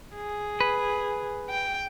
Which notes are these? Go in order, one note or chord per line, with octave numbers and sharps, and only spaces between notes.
G#4
B4
G5